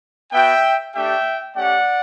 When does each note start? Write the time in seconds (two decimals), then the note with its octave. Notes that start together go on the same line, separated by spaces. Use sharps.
0.32 B3 F#4 E5 G5
0.94 A3 D4 G4 E5 G5
1.56 A3 C#4 G4 D5 F#5